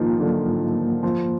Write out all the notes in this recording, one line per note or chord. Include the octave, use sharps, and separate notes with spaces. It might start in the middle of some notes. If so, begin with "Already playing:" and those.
Already playing: G#2 D#3 F3 A#3 F4
D3 F#3
G#2
D#3
A#3
F#2 F3